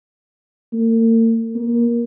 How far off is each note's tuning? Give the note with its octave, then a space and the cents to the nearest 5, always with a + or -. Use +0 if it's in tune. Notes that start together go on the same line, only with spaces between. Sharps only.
A#3 -45
A#3 +20